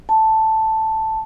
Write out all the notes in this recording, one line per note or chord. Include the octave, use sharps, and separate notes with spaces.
A5